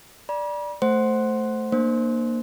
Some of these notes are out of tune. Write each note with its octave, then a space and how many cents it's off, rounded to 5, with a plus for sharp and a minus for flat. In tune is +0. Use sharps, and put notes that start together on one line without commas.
D5 +0 B5 -45
A3 +0 C5 +0 F#5 +0
A#3 +0 D4 +30 C5 +0